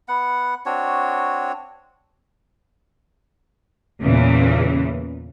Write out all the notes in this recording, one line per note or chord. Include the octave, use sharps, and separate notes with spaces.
B3 F#5
C4 D4 F#4 C#5
E2 A#2 C#3 E3